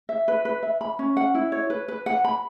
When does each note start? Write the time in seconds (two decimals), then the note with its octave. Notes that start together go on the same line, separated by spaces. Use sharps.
0.09 E5
0.28 B4
0.45 B4
0.63 E5
0.81 B5
0.99 C#4
1.17 F#5
1.35 E4
1.52 C#5
1.70 B4
1.88 B4
2.06 F#5
2.24 B5